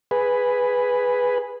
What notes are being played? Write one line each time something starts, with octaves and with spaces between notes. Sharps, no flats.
G#4 B4